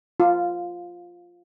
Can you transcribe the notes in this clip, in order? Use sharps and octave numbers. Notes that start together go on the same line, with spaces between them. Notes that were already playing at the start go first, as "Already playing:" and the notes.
F4